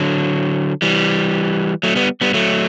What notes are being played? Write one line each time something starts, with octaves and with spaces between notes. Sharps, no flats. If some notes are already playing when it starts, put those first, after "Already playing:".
Already playing: D3 F#3
E3 G3
F#3 A3
G3 B3
G3 B3
F#3 A3